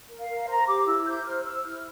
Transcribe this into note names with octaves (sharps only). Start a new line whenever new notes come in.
A#4
F5
A#4
C5 A#5
G4 D6
E4 E6
C5 G6
C5 F6
C5 E6
E4 F6